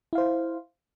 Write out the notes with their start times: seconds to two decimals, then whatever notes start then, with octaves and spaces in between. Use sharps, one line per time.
0.13 E4
0.15 F5
0.18 C5